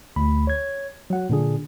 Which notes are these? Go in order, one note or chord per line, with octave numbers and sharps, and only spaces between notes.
D2 B5
C#5 G#6
F#3 F#5
A#2 D3 D4 G#4